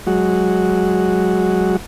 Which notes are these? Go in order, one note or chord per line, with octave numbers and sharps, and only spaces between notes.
F#3 G#3 F#4